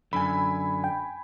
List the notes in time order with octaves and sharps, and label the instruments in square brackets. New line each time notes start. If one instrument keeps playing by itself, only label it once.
[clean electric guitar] F#2 D3 [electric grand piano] G#5 B5
[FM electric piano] G5